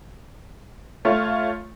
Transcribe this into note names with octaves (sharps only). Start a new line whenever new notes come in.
A3 F4 C#5